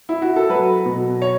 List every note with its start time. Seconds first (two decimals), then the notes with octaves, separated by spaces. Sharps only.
0.09 E4
0.22 F#4
0.36 A4
0.50 F#3 B4
0.85 B2
1.22 C#5